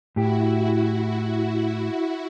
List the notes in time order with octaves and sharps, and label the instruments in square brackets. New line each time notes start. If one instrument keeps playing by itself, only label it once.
[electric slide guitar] A2 G4 [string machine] E4 F#4